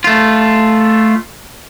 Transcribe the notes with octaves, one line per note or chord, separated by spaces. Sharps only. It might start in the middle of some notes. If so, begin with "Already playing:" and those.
A3 F4